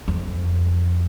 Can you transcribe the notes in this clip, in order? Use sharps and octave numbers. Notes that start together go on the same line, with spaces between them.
F2